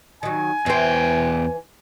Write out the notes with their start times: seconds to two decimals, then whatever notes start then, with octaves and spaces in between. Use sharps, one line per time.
0.23 D#3 F#3 G#5
0.66 E2 E3 C5 G5